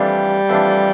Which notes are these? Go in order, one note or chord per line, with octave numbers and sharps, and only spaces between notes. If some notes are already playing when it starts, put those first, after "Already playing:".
Already playing: F2 E3 G3 A3 D4 F4
F2 E3 A3 D4 F4